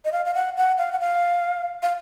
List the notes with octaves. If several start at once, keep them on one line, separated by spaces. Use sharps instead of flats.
D#5
F5
F5
F#5
F#5
F5
F#5
F5
F5